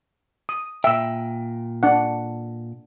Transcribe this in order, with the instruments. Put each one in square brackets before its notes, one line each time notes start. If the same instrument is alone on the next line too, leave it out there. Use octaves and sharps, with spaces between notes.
[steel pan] D#6
[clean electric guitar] A#2 G5 [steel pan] E5 E6
[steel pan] D4 F#5